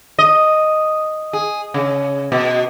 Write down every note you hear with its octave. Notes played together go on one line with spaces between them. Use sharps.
D#5
G#4
C#3
B2